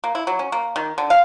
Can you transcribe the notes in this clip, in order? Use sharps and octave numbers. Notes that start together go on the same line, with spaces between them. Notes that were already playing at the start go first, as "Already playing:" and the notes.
A#3
E4
F#3
C#4
A#3
D#3
D3
F5